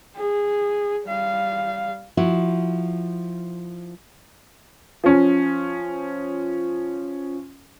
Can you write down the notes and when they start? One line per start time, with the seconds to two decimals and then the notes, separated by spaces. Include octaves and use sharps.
0.16 G#4
1.06 G3 F5
2.17 F3 E4 F#4
5.04 F3 C#4